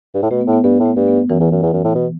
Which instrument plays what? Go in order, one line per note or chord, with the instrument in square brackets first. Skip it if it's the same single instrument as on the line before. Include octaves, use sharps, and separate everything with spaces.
[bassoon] G2
A2
[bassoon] B2 [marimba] A3
[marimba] B3
[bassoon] A2
[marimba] B3
[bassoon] G2 [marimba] B3
[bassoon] A2
[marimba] A3
[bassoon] G2 [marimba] B3
[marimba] B3
[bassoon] F#2 [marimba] E3
[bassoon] E2
F#2
E2
F#2
A2
B2